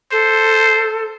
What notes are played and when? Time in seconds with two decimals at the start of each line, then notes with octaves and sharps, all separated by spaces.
0.12 A4 C5